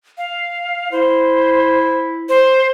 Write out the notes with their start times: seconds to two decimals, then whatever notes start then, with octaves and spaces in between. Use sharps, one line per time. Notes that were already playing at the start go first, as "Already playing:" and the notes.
0.18 F5
0.92 E4 C5
2.29 C5